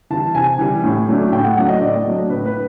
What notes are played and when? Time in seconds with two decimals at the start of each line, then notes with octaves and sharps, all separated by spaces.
0.10 E3 G3 A5
0.35 C3 G#5
0.59 E3 G3
0.84 A2
1.08 F#3 A3 D4
1.32 A2 G5
1.44 F#5
1.56 F#3 A3 D4 F#5
1.69 D#5
1.81 A2 D5
2.05 F#3 A3 D4
2.30 A2 B4
2.45 B4